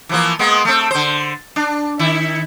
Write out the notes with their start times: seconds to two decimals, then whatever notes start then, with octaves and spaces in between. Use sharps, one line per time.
0.09 E3 F3 A#3
0.39 G#3 A#3 B3
0.65 A3 C4
0.91 D3 C5
1.56 D4
1.99 D#3 E4